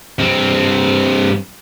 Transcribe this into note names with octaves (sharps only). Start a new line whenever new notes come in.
G2 C4